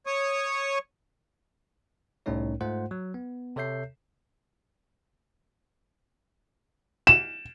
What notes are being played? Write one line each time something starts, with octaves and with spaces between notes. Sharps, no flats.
C#5 C#6 D#6
C2 A2 A3 C#4 D#4 C#5
G#2 A3 F4 C5 F#5
F#3
B3
C3 A4 C#5 E5 G6 C7
E7